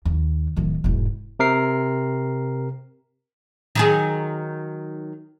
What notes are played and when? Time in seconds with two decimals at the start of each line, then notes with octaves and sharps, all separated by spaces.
0.05 D#2
0.57 D1 D#3
0.84 E1 G#2
1.39 C3 A#4 C7
3.75 D#3 F#3 G#4